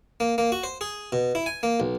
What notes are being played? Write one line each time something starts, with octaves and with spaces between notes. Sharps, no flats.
A#3
A#3
F#4
C5
G#4
B2
E4
G#5
A#3
B1